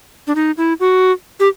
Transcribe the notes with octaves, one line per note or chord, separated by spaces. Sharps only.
D4
D#4
E4
F#4
G4